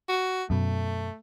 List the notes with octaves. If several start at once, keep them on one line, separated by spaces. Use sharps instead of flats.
F#4
F#2 B2 A3